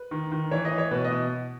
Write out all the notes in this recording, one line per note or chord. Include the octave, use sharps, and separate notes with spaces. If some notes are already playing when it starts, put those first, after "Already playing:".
Already playing: B4
D#3
D#3
E3 C#5
D#5
E3
C#5
B2 B4
D#5
B2